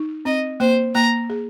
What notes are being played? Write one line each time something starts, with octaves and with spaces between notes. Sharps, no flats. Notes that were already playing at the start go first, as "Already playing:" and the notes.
Already playing: D#4
C4 D#5
A#3 C5
A#3 A#5
G#4